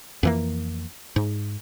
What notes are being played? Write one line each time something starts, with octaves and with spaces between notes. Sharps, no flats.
F2 E3 A#3
G#2